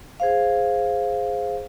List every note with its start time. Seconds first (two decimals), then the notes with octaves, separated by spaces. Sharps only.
0.20 G#4 C5 F5